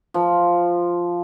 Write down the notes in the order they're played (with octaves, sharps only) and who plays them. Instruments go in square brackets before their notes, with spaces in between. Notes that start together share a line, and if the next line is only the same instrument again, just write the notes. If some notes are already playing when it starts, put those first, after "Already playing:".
[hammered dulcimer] F3